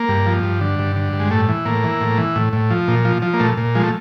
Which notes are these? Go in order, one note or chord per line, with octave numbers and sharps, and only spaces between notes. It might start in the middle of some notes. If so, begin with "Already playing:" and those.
Already playing: A#3
G2
F3
G2
D3
G2
D3
G2
G#3
A2 A3
E3
A2 A#3
E3
A2
E3
A2
A2
F3
A#2
F3
F3
A#3
A#2 A3
A#2
F3 G#3
A3